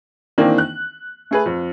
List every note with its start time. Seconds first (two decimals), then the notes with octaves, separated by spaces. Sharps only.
0.38 D#3 E3 A#3 C4 D4
0.58 F#6
1.31 A3 G#4 B4
1.46 F2